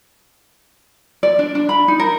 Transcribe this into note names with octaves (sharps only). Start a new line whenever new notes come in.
D5
D4
D4
B5
D#4
A#4